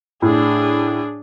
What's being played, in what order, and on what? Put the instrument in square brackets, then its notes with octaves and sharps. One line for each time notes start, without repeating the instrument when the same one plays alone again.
[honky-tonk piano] A2 [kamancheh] D4 G#4